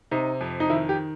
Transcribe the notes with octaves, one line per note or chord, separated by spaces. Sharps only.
C3 D#4
F2
D#4
D#3 E4
G4